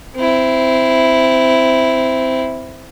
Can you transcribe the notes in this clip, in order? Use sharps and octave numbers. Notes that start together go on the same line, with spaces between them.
C4 E4